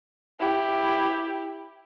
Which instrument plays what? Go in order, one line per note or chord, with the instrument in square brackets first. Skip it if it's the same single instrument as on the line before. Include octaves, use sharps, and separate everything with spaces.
[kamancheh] E4 G4